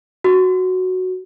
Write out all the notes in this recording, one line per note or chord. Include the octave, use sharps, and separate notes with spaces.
F#4